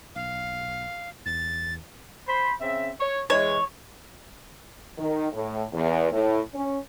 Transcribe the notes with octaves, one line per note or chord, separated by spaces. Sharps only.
B1 F5
E2 A6
C5 B5
C#3 C4 E5
C#5
E3 G#3 C#5
D#3
A2
E2
A2
C#4